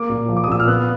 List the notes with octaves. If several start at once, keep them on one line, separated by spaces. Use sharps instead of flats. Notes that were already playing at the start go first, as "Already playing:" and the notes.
Already playing: A#3 D6
A#2
F3
D6
D#6
A#2 E6
F6
B3 F#6